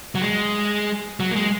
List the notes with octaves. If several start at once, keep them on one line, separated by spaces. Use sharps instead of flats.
F#3
G#3
F#3
A#3
G#3